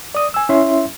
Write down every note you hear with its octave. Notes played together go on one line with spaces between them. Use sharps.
D5 D#6
G#5 E6
C#4 E4 E5 C6